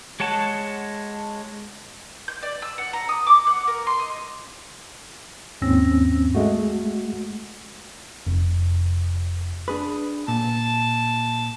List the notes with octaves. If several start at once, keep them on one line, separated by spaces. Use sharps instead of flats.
G#3 C#5 F#5 A5
G6
D5
E6
F#5
A#5
D#6
D6
F#5
A#4
C6
D#5
D#2 G#2 C4 C#4 E6 A#6
G#3 A3 F#4
F1
D4 G#4 B4
A#2 A5